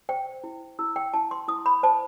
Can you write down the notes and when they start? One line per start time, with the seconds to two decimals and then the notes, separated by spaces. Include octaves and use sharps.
0.09 C5 G5
0.44 E4
0.79 E4 E6
0.96 G5
1.14 E4 A5
1.31 C6
1.48 E4 D#6
1.66 B5
1.83 C5 A5